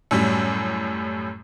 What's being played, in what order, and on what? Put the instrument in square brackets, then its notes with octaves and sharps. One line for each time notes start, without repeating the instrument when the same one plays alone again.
[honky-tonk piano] F#2 A2 G3